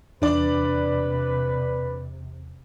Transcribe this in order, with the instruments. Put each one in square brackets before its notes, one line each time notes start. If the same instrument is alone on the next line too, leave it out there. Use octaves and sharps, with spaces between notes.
[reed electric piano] E2 [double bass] C3 [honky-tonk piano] D4 D5 [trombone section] B4